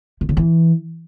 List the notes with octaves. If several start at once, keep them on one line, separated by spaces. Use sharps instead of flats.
C3
C#3
E3